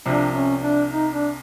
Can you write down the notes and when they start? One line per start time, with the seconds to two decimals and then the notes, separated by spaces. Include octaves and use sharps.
0.05 C2 C3 F3 D4
0.34 C#4
0.63 D4
0.92 D#4
1.13 D4